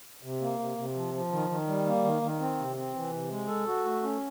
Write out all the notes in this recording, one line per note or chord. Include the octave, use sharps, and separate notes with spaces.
C3
A#3
C3
C3
F3
F3
D#3
D#3
G3
A#3
D#3
D#3
C4
C3
C4
E3
C3
G#3
A4
F#4
A3
C#4